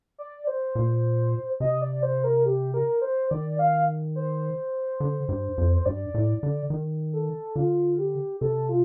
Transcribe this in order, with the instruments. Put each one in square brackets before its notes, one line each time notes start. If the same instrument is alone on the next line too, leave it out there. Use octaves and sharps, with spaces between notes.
[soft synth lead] D5
C5
[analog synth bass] A#2
[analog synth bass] C3 [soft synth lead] D#5
[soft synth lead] D5
C5
A#4
G4
A#4
C5
[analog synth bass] D#3 [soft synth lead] D5
[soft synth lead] F5
C5
[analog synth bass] D3
G2
F2
[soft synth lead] C5
[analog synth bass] G2 [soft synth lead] D5
[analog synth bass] A2
D3
D#3
[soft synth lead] A4
[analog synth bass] D3 [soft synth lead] F4
[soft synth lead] G4
[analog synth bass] C3 [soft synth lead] A4
[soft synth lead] F4